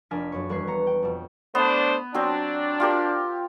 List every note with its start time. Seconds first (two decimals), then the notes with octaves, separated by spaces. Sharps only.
0.11 F1 A#3 D4 G#5 F6 B6
0.32 F#2 C#5
0.49 E1 G3 B4 C#6 G#6 C7
0.67 B3 A#5 C#7
0.87 G5
1.02 F2 B2
1.55 A3 B3 D4 C5
2.14 F#3 C4 D4 C5
2.80 F4 G4 A#4